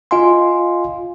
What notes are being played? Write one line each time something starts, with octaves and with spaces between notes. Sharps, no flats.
F4 D#5 F5 G#5 C6